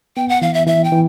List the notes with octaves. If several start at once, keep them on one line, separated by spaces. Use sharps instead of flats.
B3 G5
F#5
E3 F5
E5
E3 E5
G5
E3